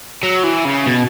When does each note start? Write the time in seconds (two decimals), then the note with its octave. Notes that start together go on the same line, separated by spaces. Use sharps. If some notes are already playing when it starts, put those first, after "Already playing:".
0.23 F#3
0.44 E3
0.65 C#3
0.86 B2